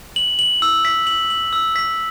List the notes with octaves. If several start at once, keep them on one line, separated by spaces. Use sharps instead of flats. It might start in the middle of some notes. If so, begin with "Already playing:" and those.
F#7
F#7
E6
B6
F#7
F#7
E6
B6